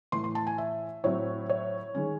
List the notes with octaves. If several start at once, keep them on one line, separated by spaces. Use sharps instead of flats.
A2 E3 A3 C6
C6
A5
G#5
E5
A2 F#3 C4 E4 C#5
C#5
D#3 G#3 C#4